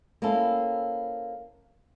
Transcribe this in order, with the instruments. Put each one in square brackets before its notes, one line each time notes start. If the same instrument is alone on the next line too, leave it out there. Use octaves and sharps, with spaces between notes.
[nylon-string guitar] A#3 C4 C#4 E4 A4